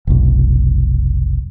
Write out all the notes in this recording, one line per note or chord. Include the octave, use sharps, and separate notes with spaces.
F1 B1